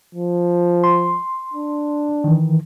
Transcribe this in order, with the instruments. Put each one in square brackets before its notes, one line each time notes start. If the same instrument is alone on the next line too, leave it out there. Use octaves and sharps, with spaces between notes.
[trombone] F3
[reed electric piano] C6
[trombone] D4
[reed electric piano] D#3 E3